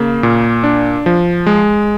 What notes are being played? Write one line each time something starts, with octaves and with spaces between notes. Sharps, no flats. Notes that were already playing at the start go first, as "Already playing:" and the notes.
Already playing: C#3 A#3
A#2
D4
F3
G#3